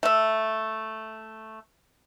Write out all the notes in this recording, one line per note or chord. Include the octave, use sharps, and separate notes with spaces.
A3 E5